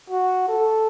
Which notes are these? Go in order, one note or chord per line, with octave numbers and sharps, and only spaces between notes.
F#4
A4